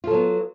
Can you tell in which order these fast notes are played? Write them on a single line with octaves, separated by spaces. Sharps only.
F4 A4 F#3 B3